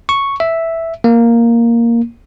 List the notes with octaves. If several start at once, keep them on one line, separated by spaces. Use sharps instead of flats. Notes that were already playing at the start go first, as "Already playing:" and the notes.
C#6
E5
A#3